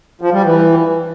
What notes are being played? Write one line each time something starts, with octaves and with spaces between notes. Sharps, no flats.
F3
G3
E3